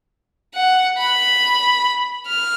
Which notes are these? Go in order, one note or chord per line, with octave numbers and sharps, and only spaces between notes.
F#5
B5
F6